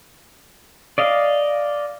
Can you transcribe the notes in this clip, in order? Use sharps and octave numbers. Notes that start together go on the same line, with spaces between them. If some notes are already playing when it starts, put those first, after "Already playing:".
D5 D#5 F5